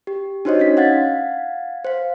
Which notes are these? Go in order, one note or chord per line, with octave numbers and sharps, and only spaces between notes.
G4
D4 D#4 F#4 C5 C#5 D#5
C#4 D#4 B6
F5 F#5 G#6 A6
C5 F5